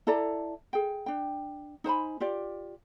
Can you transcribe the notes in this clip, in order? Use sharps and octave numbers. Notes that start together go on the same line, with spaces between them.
E4 A4 D5 A#5
G#4 G5
D4 G5
D#4 C5 G#5 B5
F4 G4 D5